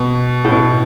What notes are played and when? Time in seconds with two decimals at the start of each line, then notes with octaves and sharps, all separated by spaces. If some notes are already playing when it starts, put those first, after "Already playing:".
Already playing: B2
0.44 A2
0.52 B2